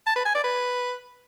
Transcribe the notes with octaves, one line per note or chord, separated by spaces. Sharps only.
A5
B4
G#5
D5
B4